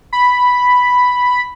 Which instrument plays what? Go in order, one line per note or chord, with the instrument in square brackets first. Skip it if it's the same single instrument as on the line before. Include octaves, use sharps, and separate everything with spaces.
[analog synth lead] B5